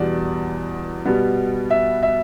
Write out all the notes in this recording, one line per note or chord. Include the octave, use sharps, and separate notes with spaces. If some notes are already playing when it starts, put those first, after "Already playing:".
Already playing: E2 B2 G3 B3 D5
B2 G3 B3
E5
E5